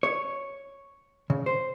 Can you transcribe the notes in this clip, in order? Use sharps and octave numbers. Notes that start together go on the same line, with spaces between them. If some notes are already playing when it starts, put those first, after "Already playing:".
C#5
C#3
C5